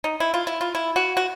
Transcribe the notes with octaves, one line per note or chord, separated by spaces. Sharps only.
D#4
E4
F4
E4
F4
E4
F#4
F#4